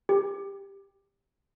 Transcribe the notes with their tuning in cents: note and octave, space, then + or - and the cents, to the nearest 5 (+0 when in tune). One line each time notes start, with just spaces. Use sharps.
G4 +15